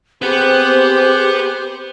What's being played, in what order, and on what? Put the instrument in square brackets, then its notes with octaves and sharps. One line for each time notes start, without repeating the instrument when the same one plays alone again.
[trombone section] C4 G#4 [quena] G4 [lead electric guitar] B4 F#5 [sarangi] C5